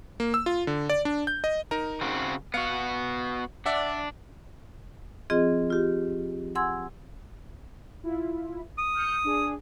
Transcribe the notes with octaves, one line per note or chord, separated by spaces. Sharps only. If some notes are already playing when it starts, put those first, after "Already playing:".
A#3
E6
F4
D3
D5
D4
G6
D#5
D#4 A#4 A#5
C#3 C4 F#4
B3 F#4 F5 C#7
D4 D5 E5 F#5
F3 C4 F4 G#4 D#5
F4 G4
F#5 G#5 C6 E6 G#6
E4 F4
D#6
F6 G6 C#7
D4 G#4